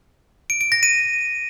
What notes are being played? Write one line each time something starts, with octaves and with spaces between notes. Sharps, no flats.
D7
D7
A#6
D#7